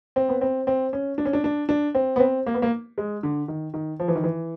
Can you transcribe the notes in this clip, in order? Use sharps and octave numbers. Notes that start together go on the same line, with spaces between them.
C4
B3
C4
C4
C#4
D4
C#4
D4
D4
D4
C4
B3
C4
A#3
B3
A#3
G#3
D3
D#3
D#3
F3
E3
D#3
E3